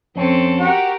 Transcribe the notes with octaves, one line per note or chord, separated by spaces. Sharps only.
F2 C4 C#4 A4
F#4 G4 A#4